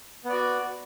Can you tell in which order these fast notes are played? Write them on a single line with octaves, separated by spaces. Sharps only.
B3 D5 F#4